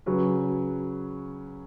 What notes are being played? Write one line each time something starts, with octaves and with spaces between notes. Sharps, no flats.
C#3 F#3 C#4 F#4 B4